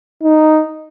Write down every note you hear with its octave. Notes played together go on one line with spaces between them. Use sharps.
D#4